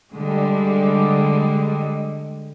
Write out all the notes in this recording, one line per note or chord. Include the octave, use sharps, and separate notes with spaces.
D3 G3 G#3